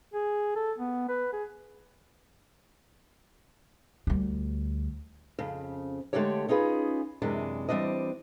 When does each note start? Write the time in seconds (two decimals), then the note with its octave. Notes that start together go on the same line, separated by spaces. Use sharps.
0.14 G#4
0.56 A4
0.78 B3
1.09 B4
1.33 G#4
4.07 D2 G3
5.39 F2 C#3
6.13 D3 G#3 A3 C#4 G4 C#5
6.49 C#4 D#4 F4 G#4 B4
7.22 F#2 C3 E3 G#3 D4
7.69 E3 G3 C4 D4 D#5